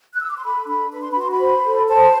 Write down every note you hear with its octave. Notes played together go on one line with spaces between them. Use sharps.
F#6
E6
D6
C6
A4 B5
D4 B5
B4 B5
C6
F#4 B5
C6
B5
C5
A4
C5 A5